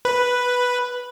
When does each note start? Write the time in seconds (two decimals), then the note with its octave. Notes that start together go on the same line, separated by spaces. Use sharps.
0.05 B4